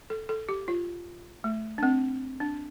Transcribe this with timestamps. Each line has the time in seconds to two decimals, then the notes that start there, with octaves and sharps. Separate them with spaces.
0.10 A4
0.29 A4
0.49 G4
0.68 F4
1.44 A3
1.78 D4
1.83 C4
2.40 D4